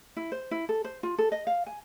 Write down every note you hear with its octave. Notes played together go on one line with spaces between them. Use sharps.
E4
C5
E4
A4
C5
F4
A4
D#5
F5
G#5